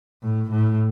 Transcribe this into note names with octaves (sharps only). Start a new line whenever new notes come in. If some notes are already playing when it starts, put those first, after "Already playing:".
A2
A2